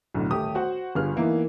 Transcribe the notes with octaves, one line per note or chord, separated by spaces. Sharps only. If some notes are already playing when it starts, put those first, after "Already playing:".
B1 A2 D3
D#1 A3 G4 D#6
F#4 C5 F#5
G1 G2 F4 G#4 B4 F6
E3 A#3 B3 D#4 E4